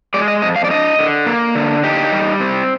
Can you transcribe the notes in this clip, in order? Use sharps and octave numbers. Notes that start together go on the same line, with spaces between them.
G#3 D5
D#5
F2 D#5
F5
D5
D4 D#5
D3
A#3
D3
D#4 G4
G3
C4